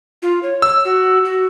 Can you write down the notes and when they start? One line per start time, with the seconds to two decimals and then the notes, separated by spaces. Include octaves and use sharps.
0.22 F4
0.43 C#5
0.62 E6
0.85 F#4
1.25 F#4